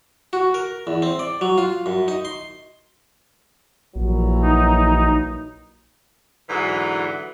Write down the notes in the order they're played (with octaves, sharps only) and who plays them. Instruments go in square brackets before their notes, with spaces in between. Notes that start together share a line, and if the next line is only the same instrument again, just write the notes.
[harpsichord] F#4
A#4
E2
C4
D5
F#3
F4
F#2
D#4
C6
[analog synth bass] A#1 [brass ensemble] A#2 E3 F#3
[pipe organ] D#4
[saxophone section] G#2 D3 E3 F#3